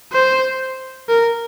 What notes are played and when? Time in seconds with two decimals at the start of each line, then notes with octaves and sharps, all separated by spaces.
0.12 C5
1.09 A#4